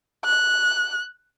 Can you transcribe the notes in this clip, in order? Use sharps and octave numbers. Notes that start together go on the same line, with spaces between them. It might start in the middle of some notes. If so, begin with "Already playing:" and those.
F#6